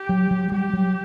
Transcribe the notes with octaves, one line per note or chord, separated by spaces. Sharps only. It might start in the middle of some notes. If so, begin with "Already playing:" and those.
Already playing: G4
F#3
F#3
G3 G4
F#3